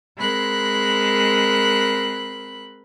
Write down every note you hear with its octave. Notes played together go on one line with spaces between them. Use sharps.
G#3 C4 A#4 B5 F#6